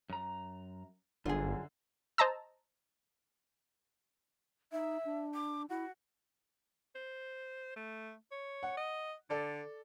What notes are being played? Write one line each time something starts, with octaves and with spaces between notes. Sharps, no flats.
F#2 A#5
G1 F#2 D3 F4 G#4
C5 D#5 A5 A#5 E6
D#4 E5
D4
D6
E4 F#4
C5
A3
C#5
F#5
D#5
D3 A4 D5